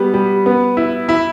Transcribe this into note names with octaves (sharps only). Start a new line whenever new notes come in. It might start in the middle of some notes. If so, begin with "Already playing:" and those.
Already playing: G3 B3
G3
B3
E4
E4